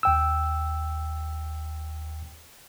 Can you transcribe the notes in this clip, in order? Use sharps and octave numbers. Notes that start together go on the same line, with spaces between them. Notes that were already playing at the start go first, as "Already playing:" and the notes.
D#2 G5 E6